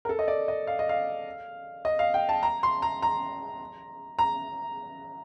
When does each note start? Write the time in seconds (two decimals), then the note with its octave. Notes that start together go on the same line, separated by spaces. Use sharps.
0.05 A#4
0.09 A4
0.19 D#5
0.28 D5
0.48 D#5
0.67 F5
0.79 D#5
0.89 F5
1.85 D#5
1.99 F5
2.14 G5
2.29 A5
2.43 A#5
2.63 C6
2.82 A#5
3.02 A#5
4.19 A#5